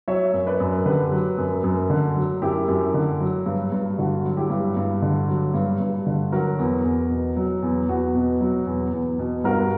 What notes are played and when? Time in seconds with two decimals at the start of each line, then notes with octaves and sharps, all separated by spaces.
0.08 F#3 C#5 E5
0.34 F#2
0.47 B4 D5
0.60 F#2
0.86 D3 G4 B4
1.12 F#3
1.38 F#2
1.64 F#2
1.90 D3
2.16 F#3
2.42 F#2 E4 G4
2.68 F#2
2.94 D3
3.20 F#3
3.46 G2
3.72 G2
3.98 D3 F#4
4.24 F#3
4.37 E4 G4
4.50 G2
4.77 G2
5.02 D3
5.28 F#3
5.54 G2
5.80 G2
6.07 D3
6.32 F#3 F#4 A#4
6.59 E2
6.84 E2
7.10 B2
7.37 F#3
7.63 E2
7.89 E2 F#4
8.15 B2
8.41 F#3
8.66 E2
8.92 E2
9.19 B2
9.44 G2 F#4 A#4